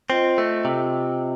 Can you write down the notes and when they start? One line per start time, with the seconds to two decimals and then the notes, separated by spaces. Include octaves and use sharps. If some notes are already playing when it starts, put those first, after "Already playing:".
0.10 C4 F4 C5 D#5
0.38 A3
0.65 C3